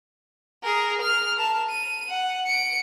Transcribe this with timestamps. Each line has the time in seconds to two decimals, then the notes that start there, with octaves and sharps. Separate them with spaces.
0.63 G#4 A#4
1.01 F6
1.37 A#4 A5
1.70 D#7
2.09 F#5
2.46 C#7 D7